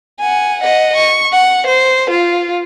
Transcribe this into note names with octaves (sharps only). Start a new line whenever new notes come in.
F#5 G#5
D#5 F#5
C#6
F#5
C5
F4